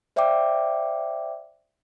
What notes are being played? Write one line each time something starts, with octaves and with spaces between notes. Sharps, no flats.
C5 D5 E5 F5 G5 D6